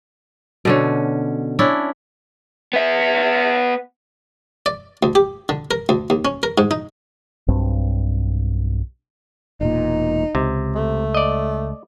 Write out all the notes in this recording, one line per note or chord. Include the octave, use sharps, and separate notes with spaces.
B2 D3 C#4
C#4 D4 E4
B3 E5
D5
D2
G4
D3
A#4
D2
D#2
C#4
A#4
G#2
D#4
B1 G2 C4
E1 A#2 D#4
C#2 C3
A3
D5 D#5